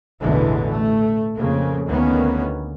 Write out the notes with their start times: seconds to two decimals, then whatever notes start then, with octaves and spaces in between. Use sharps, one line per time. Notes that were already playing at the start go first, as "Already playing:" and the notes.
0.21 A1 E2 B2 D3 E3 G#3
0.69 A3
1.35 F2 C#3 A#3
1.87 D2 D#3 A#3 B3 C#4